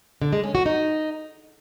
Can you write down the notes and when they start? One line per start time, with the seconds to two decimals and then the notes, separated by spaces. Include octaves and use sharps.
0.22 D3
0.33 G#3
0.44 C#4
0.55 F#4
0.66 D#4